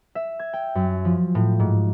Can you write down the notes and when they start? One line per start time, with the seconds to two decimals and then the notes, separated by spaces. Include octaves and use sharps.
0.15 E5
0.39 G#6
0.53 G5
0.75 F#2
1.05 F3
1.35 A2
1.60 G#2